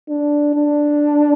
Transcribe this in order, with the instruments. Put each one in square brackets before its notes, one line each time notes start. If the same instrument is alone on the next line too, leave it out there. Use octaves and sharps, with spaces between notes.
[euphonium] D4
D4